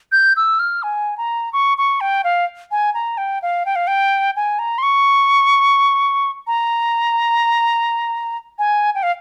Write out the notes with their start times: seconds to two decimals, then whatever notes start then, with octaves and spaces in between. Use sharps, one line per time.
0.12 G6
0.36 E6
0.59 F6
0.83 G#5
1.18 A#5
1.53 C#6
1.78 C#6
2.00 G5
2.24 F5
2.71 G#5
2.94 A#5
3.17 G5
3.42 F5
3.66 G5
3.76 F5
3.87 G5
4.36 G#5
4.59 A#5
4.78 C6
4.83 C#6
6.47 A#5
8.58 G#5
8.95 G5
9.03 F5